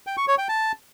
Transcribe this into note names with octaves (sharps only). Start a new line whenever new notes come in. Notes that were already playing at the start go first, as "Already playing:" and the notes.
G5
C#6
C#5
G5
A5